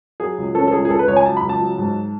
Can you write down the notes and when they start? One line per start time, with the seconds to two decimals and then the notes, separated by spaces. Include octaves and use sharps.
0.20 F#3 G#4
0.38 C#2
0.55 C#4 A4
0.67 A4
0.72 C#2 G#4
0.85 G#4
0.90 C#2 A4
0.99 B4
1.07 C#2 C#5
1.16 G#5
1.26 F#3 A5
1.37 B5
1.43 C#2
1.49 A5
1.60 F#3
1.78 G#2